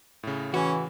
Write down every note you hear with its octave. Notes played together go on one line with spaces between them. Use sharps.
A2 C#3
E3 C#4 F#4